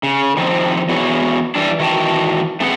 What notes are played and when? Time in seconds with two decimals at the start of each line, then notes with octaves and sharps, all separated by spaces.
0.03 C#3
0.37 D#3 F3 C4
0.89 E2 E3 B3 F#4 G#4 C#5
1.55 E3 G3 D4
1.79 D#3 E3 F#4 E5 G5 A5
2.60 A3 C4 G#4 B4 F#5